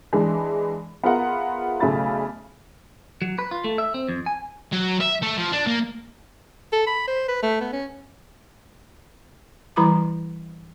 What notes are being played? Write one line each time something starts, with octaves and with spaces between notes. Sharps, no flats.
E3 G#3 D4
B3 F4 G#4 A#4 E5 F#5
B1 C#3 A3 E5 B5 A6
F#3
B4
F4
A3
E5
C4
F2
G#5
F#3
E5
A3
F3
D4
A#3
A4
B5
C5
B4
A3
B3
C#4
E3 G3 E4 A#5 B5 D6